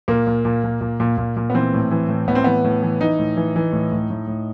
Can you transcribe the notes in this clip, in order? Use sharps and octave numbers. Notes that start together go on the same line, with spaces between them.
A#2 A#3
A#2
A#2
A#2
A#2
A#2
A#2
A#2
B3
E3 C4
A2
E3
A2
A2 B3
C4
E3 B3
A2
E3
E3 D#4
A2
E3
E3
A2
A2
A2
A2